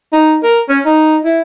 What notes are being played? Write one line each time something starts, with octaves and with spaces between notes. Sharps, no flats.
D#4
A#4
C#4
D#4
E4